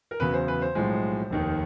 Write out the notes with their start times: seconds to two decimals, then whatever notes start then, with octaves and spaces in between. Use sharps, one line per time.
0.11 A#4
0.20 E2 C#3 F#3 B4
0.34 C5
0.48 B4
0.62 C5
0.75 B1 A2 F3 G#3
1.30 F1 D#2 D#3